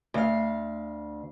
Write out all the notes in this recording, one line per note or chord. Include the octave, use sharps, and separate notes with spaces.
D2 F5